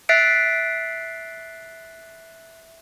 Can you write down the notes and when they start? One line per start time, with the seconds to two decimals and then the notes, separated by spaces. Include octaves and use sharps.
0.09 E5 F#6 A6 B6 C7 D7